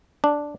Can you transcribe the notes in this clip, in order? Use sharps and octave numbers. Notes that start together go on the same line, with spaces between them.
D4